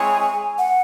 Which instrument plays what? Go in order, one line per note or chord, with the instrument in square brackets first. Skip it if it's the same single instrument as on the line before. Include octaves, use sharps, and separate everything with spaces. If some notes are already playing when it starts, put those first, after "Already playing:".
Already playing: [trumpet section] G#3 C4 E4 G#4 C#5 [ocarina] G#5
[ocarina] F#5